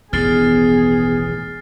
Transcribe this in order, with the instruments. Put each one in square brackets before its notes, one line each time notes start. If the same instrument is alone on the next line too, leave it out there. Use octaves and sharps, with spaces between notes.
[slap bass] E1 A1 D#3 [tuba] B3 [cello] G#4 [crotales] F6 A6 C7